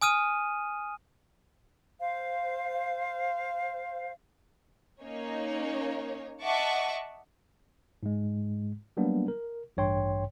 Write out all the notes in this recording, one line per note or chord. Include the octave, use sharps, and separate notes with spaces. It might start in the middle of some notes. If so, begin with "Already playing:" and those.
G#5 D#6 F6 D#7
C5 F5
A#3 C#4 D#4 C#5
D#5 E5 F#5 A5 C#6 D6
G#2 G#3
F#3 G3 A#3 B3 D4
A#4
A1 G2 C#5 G5 C6